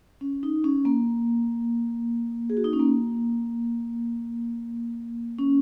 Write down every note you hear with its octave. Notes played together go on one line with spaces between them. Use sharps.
C#4
D#4
C#4
A#3
G#4
F#4
D#4
C#4
A#3
C#4